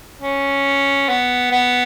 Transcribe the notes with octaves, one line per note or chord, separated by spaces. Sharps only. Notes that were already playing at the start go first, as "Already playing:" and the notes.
C#4
B3
B3